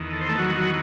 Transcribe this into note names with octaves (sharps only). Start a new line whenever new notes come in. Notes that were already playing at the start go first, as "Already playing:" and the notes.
Already playing: E2 D#3
A4
C5
A3 A4
F#3 F#4
F#3 F#4